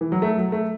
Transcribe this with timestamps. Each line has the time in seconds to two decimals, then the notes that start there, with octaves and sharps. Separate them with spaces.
0.01 E3
0.12 F#3
0.22 A3
0.38 F#3
0.52 A3